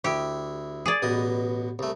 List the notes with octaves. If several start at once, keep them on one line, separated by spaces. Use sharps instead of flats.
D2 E4 G4
G#4 D5
A1 B2 D#5
C2 A3